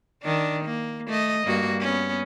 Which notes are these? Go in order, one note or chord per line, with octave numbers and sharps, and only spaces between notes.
D#3 D4
A#3
A3 D#5
G2 A#3 F#4
B3 C#4